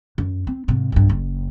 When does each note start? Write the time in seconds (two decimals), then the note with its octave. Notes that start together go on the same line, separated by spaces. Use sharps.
0.18 F#2
0.47 C4
0.68 G#2 C3
0.92 B1 G2
1.09 F#1